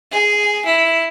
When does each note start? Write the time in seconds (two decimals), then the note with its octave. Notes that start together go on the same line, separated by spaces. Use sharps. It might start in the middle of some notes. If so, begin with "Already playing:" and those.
0.12 G#4
0.65 E4